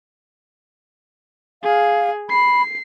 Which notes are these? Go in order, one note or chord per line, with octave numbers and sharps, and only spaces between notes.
G#4 F5
B5 C7